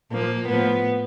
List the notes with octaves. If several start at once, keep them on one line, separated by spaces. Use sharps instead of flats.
A#2 F3 A#3
A2 F3 B3